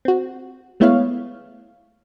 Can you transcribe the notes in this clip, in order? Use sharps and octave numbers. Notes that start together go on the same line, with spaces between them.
C4 F#4
G#3 A3 B3 E4 C#5 F5